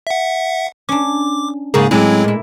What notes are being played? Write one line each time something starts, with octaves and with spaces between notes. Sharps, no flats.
E5 F#5
C#4 D4 D6
G#2 C#3 A#3 G#4
A2 F#3 G#3 C4 E4 D5
A#2 E4